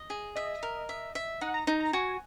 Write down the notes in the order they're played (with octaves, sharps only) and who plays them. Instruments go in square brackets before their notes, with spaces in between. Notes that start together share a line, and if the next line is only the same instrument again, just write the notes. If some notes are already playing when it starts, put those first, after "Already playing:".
Already playing: [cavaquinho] D#5
G#4
[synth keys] D#5 [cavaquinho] E5
[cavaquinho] A#4
E5
E5
[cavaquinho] D#4 [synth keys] F#5
[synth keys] A#5
[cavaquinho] D#4 [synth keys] A#5
[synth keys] A#5
[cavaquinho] F#4 [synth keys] G#5